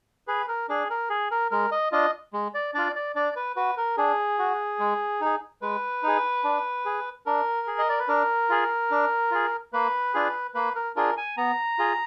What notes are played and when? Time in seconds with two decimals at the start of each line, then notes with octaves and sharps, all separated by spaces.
0.28 G#4 B4
0.48 A#4
0.69 D4 G#4
0.90 A#4
1.10 G#4
1.31 A#4
1.51 G#3 A#4
1.72 D#5
1.92 D4 F4 D#5
2.33 G#3
2.54 D5
2.74 D4 F4 D5
2.96 D5
3.15 D4 D5
3.36 B4
3.56 F#4 B4
3.77 A#4
3.97 D4 G#4
4.39 F#4
4.79 G#3
5.21 D#4 G#4
5.62 G#3 B4
6.03 D#4 G#4
6.44 D4
6.85 G#4
7.26 D4 A#4
7.67 G#4
7.78 D#5
7.89 D5
7.99 B4
8.08 D4 A#4
8.50 F4 G#4
8.91 D4
9.31 F4 G#4
9.73 A#3 B4
10.14 D4 F4 G#4
10.54 A#3 B4
10.76 A#4
10.96 D4 F4 G#4 A#4
11.17 G#5
11.37 B3 A#5
11.78 F4 G#4